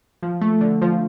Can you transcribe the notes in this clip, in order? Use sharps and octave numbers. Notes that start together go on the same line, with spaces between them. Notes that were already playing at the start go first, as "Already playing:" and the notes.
F3
A3
D3
F3